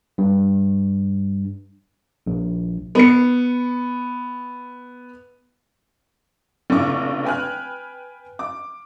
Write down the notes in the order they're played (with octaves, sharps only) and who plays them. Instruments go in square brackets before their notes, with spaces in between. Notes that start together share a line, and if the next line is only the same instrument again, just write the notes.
[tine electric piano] G2
A#1
[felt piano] B3 C#7
[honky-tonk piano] F1 A#1 C#3 E4 C#6 D6
B4 G5 G#5 F6 F#6
D6